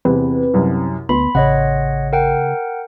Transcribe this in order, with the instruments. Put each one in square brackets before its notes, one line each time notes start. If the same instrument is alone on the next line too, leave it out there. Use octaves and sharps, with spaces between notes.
[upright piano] E2 C3 [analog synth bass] C4 [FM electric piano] B4
[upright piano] C2 F#2
[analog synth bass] D2 [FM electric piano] B3 [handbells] B5 [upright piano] C6
[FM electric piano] A1 [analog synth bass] C#3 [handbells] C#5 D#5 F#5
[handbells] A#4 F#5 G5